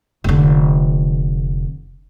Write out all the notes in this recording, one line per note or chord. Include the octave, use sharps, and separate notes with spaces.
F1 D3